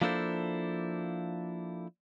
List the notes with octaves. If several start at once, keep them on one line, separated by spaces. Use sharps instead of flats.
F3 A#3 D4 E4 A4 C5